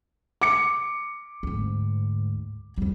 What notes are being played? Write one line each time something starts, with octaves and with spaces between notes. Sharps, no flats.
D6 C#7
D2 G#2
F2 G3